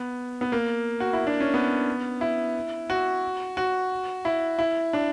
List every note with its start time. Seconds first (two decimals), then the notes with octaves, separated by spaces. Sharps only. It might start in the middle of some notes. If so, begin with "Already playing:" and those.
Already playing: B3
0.41 B3
0.52 A#3
1.00 F#4
1.13 E4
1.27 D4
1.40 C#4
1.54 B3
2.21 E4
2.90 F#4
3.57 F#4
4.25 E4
4.59 E4
4.93 D4